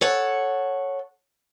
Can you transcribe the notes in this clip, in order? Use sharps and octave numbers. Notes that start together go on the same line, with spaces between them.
A4 C#5 F#5